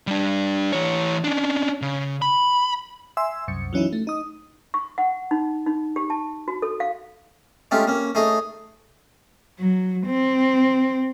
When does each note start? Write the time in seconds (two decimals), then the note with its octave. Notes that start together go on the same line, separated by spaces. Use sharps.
0.07 G3 D4
0.73 E3 C#5
1.24 C#4 D4
1.82 C#3
2.22 B5
3.17 E5 G#5 C6 E6
3.48 C2 F#2 C#7
3.73 E3 F#3 C#4 D#4 E4
3.93 A3
4.07 D#4 D#6
4.74 C#6
4.98 F#5
5.31 D#4
5.66 D#4
5.96 G4
6.10 A5
6.48 F#4
6.62 A4
6.80 F5
7.71 G#3 A3 C#4 F4 G4
7.87 A#3 C#4
8.15 A3 D#4 G#4 C#5 D#5
9.59 F#3
10.06 C4